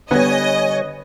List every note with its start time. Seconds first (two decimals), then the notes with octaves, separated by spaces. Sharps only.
0.11 D3 G3 B3 C#5 D#5 G#5